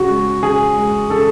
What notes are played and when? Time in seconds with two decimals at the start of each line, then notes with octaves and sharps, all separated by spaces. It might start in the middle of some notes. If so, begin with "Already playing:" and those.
Already playing: C#3 F#4
0.09 G#3
0.43 C#3 G#4
0.77 G#3
1.10 C#3 A4